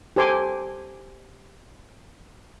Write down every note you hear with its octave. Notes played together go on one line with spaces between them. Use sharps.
G4 A4 C5 G#5 C6 D6